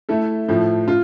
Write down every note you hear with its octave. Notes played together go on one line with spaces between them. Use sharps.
A3 E4 A4
A2 F3 A3 E4
F4